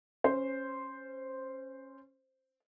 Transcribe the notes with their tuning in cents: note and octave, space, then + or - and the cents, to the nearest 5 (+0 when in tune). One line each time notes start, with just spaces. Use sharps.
C#4 -20 C5 +0